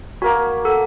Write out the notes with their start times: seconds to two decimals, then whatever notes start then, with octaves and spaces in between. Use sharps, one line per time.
0.22 A#3 F#4 A#4 B5
0.65 A4 F#5